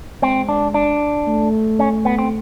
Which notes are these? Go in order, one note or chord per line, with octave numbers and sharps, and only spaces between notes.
G#3 C4
D4
D4
A3
C#4
B3
C4